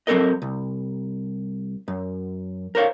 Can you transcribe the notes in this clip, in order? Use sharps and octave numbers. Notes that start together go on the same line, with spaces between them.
F#3 C4 C#4 A4 A#4 D#5
C2
F#2
A#4 C5 C#5 F5